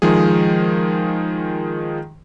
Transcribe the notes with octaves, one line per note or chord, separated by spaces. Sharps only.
D#3 F3 G#3 G#4